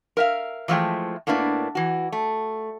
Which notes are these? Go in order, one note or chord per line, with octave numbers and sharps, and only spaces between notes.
A#4 E5 F5
E3 F3 G#3 A3 E5 G5
A2 A#3 B3 D4 E4
E3 F#4
A3